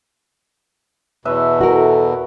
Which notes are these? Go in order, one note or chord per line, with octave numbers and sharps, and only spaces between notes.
E2 B2 B4 E5
E4 F#4 A4 A#4